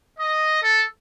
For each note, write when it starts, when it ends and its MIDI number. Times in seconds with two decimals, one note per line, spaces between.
0.18 0.62 75
0.63 0.84 69